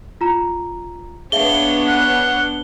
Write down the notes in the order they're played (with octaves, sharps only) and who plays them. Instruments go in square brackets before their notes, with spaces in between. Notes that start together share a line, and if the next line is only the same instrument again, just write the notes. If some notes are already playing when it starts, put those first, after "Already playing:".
[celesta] F4 A#5
[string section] B3 D4 C#5 [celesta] G#4 E5 F5 [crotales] G7
[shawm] F#5